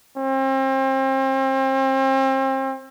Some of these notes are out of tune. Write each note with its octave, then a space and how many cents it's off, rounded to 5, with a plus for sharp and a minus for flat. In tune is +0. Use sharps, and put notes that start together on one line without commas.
C4 +35